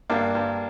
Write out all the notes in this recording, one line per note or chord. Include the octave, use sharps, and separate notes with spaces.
G2 A#3 D4
G2